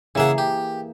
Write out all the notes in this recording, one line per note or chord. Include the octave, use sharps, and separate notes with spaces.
C#3 E3 A#3 G#4 E5 F#5
G4